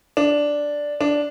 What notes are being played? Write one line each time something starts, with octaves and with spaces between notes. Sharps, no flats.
D4
D4